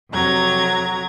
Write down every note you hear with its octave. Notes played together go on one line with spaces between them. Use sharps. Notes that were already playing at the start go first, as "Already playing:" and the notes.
F2 C3 F#3 A#5 G#6